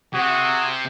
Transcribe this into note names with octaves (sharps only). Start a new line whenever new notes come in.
C3 F#4 G#4